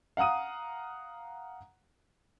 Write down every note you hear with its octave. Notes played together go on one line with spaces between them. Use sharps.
F5 F#5 A#5 D#6 D#7